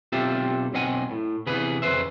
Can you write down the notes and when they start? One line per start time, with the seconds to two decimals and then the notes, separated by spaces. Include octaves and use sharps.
0.12 B1 C4 F4 G4 A4 E5
0.73 B1 C4 D#5 F#5 G#5
1.11 A2
1.47 C3 E3 B3 G#4 B4
1.82 F2 C#3 A#3 B4 C5 E5